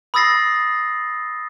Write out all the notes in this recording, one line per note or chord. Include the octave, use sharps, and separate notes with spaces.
B5 D#6 E6 A6 A#6 C7